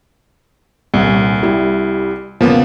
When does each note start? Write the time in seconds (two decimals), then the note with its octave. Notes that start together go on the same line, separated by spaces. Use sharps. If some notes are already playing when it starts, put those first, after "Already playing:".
0.94 D#1 C2
1.43 G3 E4
2.41 E1 C#3 F3 A#3 B3